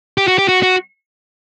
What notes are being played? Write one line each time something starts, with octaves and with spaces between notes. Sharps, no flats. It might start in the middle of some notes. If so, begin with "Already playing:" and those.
G4
F#4
G4
F#4
F#4